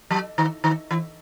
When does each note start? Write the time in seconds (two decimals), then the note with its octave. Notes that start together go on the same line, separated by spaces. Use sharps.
0.11 F#3
0.38 D#3
0.64 D#3
0.91 E3